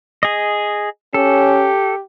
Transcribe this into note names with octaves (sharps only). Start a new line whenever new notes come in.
G#4 D#5
C#4 G4 A4